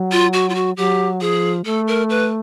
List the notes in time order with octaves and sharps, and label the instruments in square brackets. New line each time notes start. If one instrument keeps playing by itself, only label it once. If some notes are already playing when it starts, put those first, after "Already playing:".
Already playing: [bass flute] F#3
[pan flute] F4
F#4
F4
F#4
[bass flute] F#3 [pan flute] G4
[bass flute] F3 [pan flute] G#4
[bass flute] A3 [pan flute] A4
[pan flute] A#4
B4